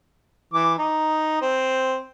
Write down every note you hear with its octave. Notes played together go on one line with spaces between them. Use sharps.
E3 D6
D#4
C4